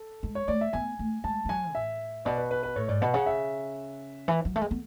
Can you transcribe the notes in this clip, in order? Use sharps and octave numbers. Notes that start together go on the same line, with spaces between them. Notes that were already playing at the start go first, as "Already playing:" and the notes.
Already playing: A4
G#3
C#5
A3 D5
E5
B3 G#5
A3
G#3 A5
G#3
F#3 G#5
A2 E5
B2 D5
B4
B4
B4
A2 C#5
G#2 D5
B2 F#5
C#3 F#5
E5
E3
F#3
A3
G#3
B3